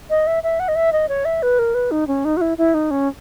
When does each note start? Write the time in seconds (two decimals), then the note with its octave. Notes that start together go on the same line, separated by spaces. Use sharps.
0.10 D#5
0.27 E5
0.43 E5
0.60 F#5
0.68 D#5
0.75 E5
0.92 D#5
1.09 C#5
1.25 E5
1.42 B4
1.59 A#4
1.74 B4
1.91 D#4
2.07 C#4
2.25 D#4
2.37 F#4
2.41 E4
2.58 E4
2.74 D#4
2.91 C#4